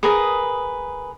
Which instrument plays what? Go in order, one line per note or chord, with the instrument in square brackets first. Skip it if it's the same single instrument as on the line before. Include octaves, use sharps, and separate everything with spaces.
[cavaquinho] G#4 A#4 B4 D#6